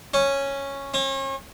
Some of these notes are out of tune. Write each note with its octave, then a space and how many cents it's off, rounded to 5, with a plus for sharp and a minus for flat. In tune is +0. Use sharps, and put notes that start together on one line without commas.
C#4 -5
C#4 -40